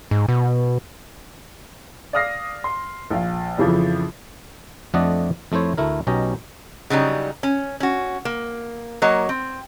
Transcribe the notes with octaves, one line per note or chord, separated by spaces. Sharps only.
G#2
B2
D5 F5 D#6 F6 A#6 C7
C6
A#1 F5
F2 C#3 E3 F3
F2 A3 D4 D5 D#5 F#5
F2 A3 E4 C5 C#5
D2 A3 E4 A#4
B1 B2 C#4 G4 D#5 A#5
C#3 F#3 G3 D#4
C#4
C#4 F#4
A#3
F#3 A#3 C#5 D#5
C4